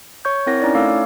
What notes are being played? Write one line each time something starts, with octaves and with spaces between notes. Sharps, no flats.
C#5 C#6 G6
C4 E4 A#4 C#5 F#5 A#6
C#4 D#4 E4 D5
A3 A4 F5 D6 E6
C#5